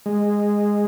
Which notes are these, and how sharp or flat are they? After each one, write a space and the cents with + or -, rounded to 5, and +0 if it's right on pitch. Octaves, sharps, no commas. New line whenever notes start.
G#3 -10